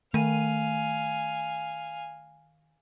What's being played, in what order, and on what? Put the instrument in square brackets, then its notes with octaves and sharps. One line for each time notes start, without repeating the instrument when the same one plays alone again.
[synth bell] D#3 D#7 [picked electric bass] A3 [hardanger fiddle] F5 G#5